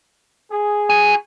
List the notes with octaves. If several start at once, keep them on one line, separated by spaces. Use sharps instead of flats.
G#4
F#4 G#5